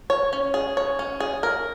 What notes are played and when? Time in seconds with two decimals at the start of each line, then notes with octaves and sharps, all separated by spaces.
0.10 C#5
0.33 C#4
0.54 G#4
0.77 C#5
0.99 C#4
1.20 G#4
1.43 A#4